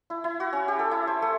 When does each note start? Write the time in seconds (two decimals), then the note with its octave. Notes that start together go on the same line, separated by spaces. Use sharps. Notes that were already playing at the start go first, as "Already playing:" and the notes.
0.10 E4
0.24 E4
0.40 F#4
0.53 C#4
0.68 G4
0.79 A4
0.91 E4
1.07 C5
1.22 A3